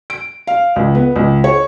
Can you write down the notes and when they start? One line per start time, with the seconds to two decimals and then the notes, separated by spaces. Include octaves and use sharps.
0.10 D7
0.47 F5
0.76 C#2
0.95 B3
1.16 C#2
1.44 C#5